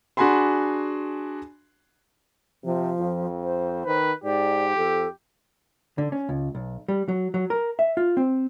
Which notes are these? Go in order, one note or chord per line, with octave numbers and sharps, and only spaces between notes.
D4 F#4 G#4 G#5 B5 C6
C3 F3
F2
C5
D#3 B4
G#2 G4 D5
F2 A4
D3
C#4
C#2
B1
G3
F#3
F#3
A#4
E5
F4
C4